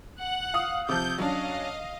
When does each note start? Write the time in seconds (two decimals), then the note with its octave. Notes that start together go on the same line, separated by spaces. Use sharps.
0.18 F#5 F#6
0.54 F5 D#6
0.89 C3 F3 G6
1.18 F#3 C#4 D4 D#5 F5